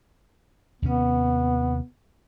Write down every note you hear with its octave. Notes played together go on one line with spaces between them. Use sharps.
D#2 C3 B3 C#4